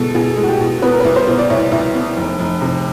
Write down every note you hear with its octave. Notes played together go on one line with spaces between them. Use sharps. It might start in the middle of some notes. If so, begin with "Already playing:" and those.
Already playing: B2 G#3 A4
B2 G#4
G#3
F#4
G4
B2
B3 B4
A#4
B4
C2
C5
B2
D5
C2 C#5
C2
B3
F1
F1
C3